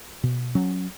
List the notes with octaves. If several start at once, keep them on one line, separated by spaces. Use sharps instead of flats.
B2
F#3 C#4